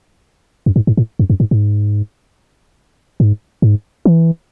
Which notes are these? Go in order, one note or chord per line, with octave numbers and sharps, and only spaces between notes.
F#2
G#2
G#2
A2
F#2
F#2
G#2
G#2
G#2
G#2
E3